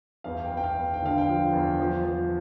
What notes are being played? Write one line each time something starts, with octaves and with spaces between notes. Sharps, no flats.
E2 F5
G5
E2
G5
F5
E2
G5
D3 F5
G5
F3
E2
F3
F3